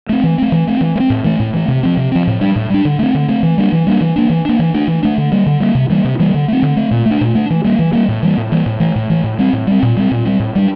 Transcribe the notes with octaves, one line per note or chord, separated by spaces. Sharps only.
A3 C4
E3
A3 C4
E3
A3 C4
E3
A3
C4
A2
E3 A3
A2
E3 A3
C3
F3 C4
C3
F3 C4
A2
G3 D4
A2
G3 D4
D3
A3 C4
D3
A3 C4
E3
G3 A#3 D4
E3
G3 A#3 D4
E3
A#3 D4
E3
A#3 D4
E3
A3 D4
E3
A3 D4
D3
G3 A#3
D3
G3 A#3
C3
E3 G3 A#3
C3
E3 G3 A#3
D3
A3 C4
D3
A3 C4
A#2
A3
D4
A#2
A3 D4
E3
G3 A#3
E3
G3 A#3
A2
E3 G3 A#3
A2
E3 G3 A#3
A2
E3 A3
A2
E3 A3
A2
G3 C4
A2
G3 C4
A#2
G3 C4
A#2
G3 C4
A2
G3 D4